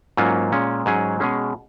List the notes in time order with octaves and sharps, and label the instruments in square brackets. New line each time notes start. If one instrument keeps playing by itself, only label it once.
[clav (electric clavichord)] G#2 F#3 A#3 C#4 F4
A#2 G#3 C#4
G#2 F#3 C#4 G#4
B2 G#3 C#4 G#4